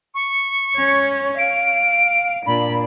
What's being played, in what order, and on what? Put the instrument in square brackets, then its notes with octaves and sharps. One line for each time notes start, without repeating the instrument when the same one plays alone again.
[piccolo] C#6
[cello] C#4 C#5
[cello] F5 [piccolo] D7
[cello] A#2 D4 [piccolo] B5